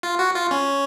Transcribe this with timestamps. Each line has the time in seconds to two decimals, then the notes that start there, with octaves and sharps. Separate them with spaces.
0.03 F4
0.19 F#4
0.35 F4
0.51 C#4